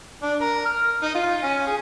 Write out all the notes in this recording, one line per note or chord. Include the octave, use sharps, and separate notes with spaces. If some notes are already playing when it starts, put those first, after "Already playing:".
D4
A#4
F6
D#4
F4
C#4
G#4